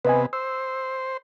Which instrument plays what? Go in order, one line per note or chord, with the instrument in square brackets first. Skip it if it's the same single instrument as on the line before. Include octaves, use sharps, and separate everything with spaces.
[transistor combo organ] C3 B3 [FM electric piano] B4 D#5 G#5
[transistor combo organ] C5 [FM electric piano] E6